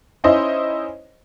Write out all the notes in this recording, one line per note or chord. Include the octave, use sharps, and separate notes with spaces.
C#4 D#4 E4 C5 D#5